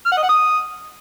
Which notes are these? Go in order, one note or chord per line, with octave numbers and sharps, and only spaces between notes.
F6
F#5
D#5
F#5
D#6